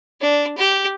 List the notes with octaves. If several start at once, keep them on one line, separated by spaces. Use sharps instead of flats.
D4
G4